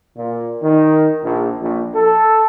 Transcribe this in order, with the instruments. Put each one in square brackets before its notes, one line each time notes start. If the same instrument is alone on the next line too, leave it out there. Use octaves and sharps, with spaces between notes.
[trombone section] A#2
D#3
A#1
A#1
A4